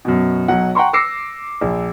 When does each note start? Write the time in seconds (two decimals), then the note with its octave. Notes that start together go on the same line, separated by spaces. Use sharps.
0.05 F#2 B2
0.48 B1 F#3 F#5
0.75 F#5 G5 A#5 C6 C#6
0.93 D6 E6 A#6 C7 C#7
1.61 A#1